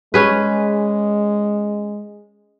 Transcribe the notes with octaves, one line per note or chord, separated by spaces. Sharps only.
G#3 C#4 G#4 B4